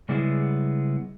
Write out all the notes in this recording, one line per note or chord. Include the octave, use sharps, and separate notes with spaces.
C#3 G3 G#3 B3 E4 G#4